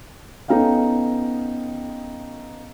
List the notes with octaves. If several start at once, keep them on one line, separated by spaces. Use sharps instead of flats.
B3 C#4 D#4 A4 F5 G5